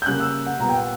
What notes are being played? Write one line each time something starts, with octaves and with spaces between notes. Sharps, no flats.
G6
C#3 G3 A#3 F#6
E6
F#5
A#2 G3 B3 A#5
G5
F#5